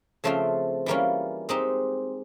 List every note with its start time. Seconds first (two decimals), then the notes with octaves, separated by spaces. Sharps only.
0.24 C#3 F3 A3 C4 F4
0.86 E3 G3 A#3 C#4 F4
1.49 G#3 C4 D#4 G4